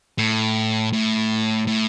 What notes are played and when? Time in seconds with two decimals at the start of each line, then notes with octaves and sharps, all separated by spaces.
0.18 A2
0.93 A2
1.67 A2